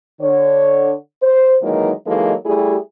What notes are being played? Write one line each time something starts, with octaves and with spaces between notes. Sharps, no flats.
D3 C#5
C5
D#3 E3 F#3 G#3 A#3 D#4
E3 F#3 G#3 A#3 D#4 A4
G3 A3 E4 G4 G#4